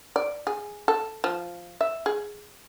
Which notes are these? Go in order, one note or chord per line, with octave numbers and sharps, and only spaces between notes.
D5
G#4
A4
F3
E5
G#4